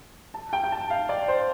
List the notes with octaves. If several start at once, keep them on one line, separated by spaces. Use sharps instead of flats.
A5
G5
G5
A5
F5
D5
C5